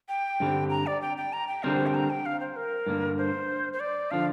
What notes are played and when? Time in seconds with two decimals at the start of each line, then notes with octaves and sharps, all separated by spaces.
0.09 G5
0.40 G2 D3 G3 C4
0.70 A#5
0.87 D5
1.02 G5
1.17 G5
1.33 A#5
1.48 G5
1.63 D3 G3 C4 A#4 C5
1.86 G5
1.95 A#5
2.10 G5
2.26 F5
2.40 C5
2.56 A#4
2.86 G2 D3 A#3
3.18 C5
3.73 C5
3.80 D5
4.11 D3 F3 D4 F5